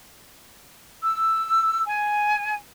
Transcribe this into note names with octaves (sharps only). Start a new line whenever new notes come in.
E6
G#5